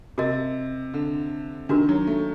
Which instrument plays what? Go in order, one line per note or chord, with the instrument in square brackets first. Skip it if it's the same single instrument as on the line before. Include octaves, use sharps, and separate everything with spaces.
[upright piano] C3 [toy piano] F#4 A#4 D#5
[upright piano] D3
[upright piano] D#3 [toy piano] D4 F#4 A#4
[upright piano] F#3
A3